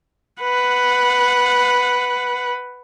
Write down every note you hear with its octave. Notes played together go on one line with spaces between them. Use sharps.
B4 F#5